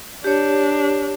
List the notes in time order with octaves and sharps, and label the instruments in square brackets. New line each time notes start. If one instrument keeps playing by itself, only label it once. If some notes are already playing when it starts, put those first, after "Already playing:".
[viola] D4 [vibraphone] G4 C#5